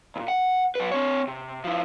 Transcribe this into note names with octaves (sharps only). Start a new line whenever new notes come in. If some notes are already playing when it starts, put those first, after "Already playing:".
C#2 A#2
F#5
F#3 B4
C4 C#5
C3
F3 E4